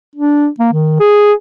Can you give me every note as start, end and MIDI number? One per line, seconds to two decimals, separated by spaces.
0.16 0.48 62
0.59 0.68 58
0.73 0.98 51
1.00 1.33 68